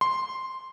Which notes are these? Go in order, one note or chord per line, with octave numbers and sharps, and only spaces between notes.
C6